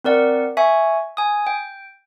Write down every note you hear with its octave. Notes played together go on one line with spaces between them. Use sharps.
C4 A#4 D5 F#5
E5 G#5 C#6
G#5 D#6
G5